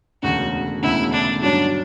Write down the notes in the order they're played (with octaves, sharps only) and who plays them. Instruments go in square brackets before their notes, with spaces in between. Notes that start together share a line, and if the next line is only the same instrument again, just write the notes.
[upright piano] E1 D2 C#3 [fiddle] F#4
[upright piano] E1 D2 C#3 [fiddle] E4
[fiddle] D4
[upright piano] G2 F#3 C#4 F#4 [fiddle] D4